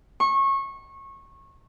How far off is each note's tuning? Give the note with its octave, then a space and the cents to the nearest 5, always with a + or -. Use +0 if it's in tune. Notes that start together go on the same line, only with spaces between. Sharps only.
C#6 -25